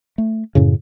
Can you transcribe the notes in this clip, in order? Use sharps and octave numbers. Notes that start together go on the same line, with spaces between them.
A3
F#2 A2 C#3